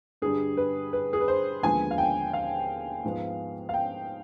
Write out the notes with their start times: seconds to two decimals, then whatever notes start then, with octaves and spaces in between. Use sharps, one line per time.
0.22 G2 D3 G3 G#4
0.57 B4
0.93 B4
1.13 G#4
1.21 B4
1.28 C5
1.63 D#2 D3 F3 G#3 B3 G#5
1.91 F5
1.98 G5
2.33 F5
3.04 G#2 F3 G#3 B3
3.69 F5
3.74 G5